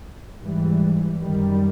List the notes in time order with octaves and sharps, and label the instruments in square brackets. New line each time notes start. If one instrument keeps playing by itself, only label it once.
[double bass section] G#2 E3 G3
F#2 D#3 G3